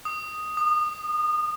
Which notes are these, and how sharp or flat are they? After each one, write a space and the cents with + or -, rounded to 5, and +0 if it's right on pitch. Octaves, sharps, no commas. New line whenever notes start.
D#6 +0
D#6 -30